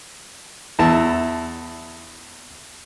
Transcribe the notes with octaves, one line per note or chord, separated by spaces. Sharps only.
E2 E4 A5